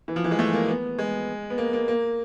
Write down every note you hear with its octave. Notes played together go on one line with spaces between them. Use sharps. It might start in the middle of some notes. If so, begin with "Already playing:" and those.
E3
F3
E3
G#3
A3
A#3
B3
G#3
B3
A#3
A#3
A#3